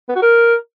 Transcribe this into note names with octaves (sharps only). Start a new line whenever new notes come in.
B3
F#4
A#4